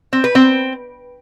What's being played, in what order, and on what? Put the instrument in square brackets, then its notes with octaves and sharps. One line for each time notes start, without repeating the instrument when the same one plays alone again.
[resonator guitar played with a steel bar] C4
B4
C4